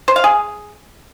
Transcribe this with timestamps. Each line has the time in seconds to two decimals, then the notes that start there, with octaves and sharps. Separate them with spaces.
0.08 C5
0.16 F5
0.24 G#4